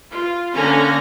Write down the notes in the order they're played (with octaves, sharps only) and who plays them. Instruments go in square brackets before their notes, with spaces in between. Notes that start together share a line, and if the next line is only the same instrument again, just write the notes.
[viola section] F4
D3 A#3 C#4 F5 G#5 A#5